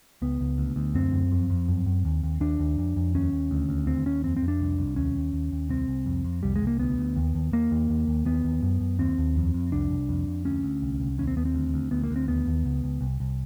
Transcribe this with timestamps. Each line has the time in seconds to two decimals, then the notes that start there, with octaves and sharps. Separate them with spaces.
0.22 C#2 B3
0.41 C#2
0.58 D2
0.76 D2
0.94 F#2 C4
1.12 F#2
1.32 F2
1.50 F2
1.68 F#2
1.86 F#2
2.05 D#2
2.23 D#2
2.40 D#2 D4
2.59 D#2
2.78 F2
2.96 F2
3.15 D#2 C#4
3.32 D#2
3.51 D2
3.69 D2
3.87 D#2 C4
4.06 D#2 C#4
4.24 F2 C4
4.37 C4
4.42 F2
4.48 D4
4.60 C2
4.79 C2
4.96 D#2 C#4
5.15 D#2
5.33 D#2
5.52 D#2
5.69 C2 C4
5.88 C2
6.06 F2
6.25 F2
6.43 C2 G3
6.56 G#3
6.62 C2
6.67 A#3
6.79 D2 B3
6.98 D2
7.16 D#2
7.35 D#2
7.52 D#2 A#3
7.71 D#2
7.90 D#2
8.07 D#2
8.25 D#2 B3
8.44 D#2
8.63 F#2
8.81 F#2
8.99 D#2 C4
9.18 D#2
9.36 F2
9.54 F2
9.72 C2 D4
9.90 C2
10.09 F2
10.27 F2
10.45 D2 C#4
10.63 D2
10.82 C2
11.00 C2
11.18 D#2 C#4
11.27 C4
11.36 D#2 B3
11.45 C4
11.55 D2
11.74 D2
11.91 D2 B3
12.04 A#3
12.11 D2
12.16 C4
12.28 D#2 B3
12.47 D#2
12.65 C#2
12.84 C#2
13.01 C2
13.20 C2